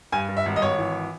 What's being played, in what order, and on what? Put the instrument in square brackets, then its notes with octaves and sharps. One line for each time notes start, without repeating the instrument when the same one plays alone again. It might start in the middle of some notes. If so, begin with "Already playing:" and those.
[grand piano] G2 G#5
G2
E5
G#1
D#5
G#1 C#5
E3